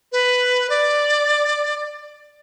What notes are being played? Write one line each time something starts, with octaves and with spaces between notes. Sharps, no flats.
B4
D5